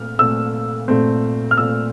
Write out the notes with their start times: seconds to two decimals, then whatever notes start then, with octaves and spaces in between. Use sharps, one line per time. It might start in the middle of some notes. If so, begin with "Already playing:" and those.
Already playing: A#2 A3 C4 F6
0.19 A#2 A3 C4 E6
0.88 A#2 A3 C4
1.51 F6
1.58 A#2 A3 C4 E6